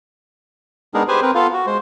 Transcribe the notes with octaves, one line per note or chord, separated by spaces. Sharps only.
G#3 B3 D4 D#4 G#4 A#4
G4 G#4 B4 C5 G#5
C4 A#4 B4
B3 F4 A4 F5
F#4
G#3 C5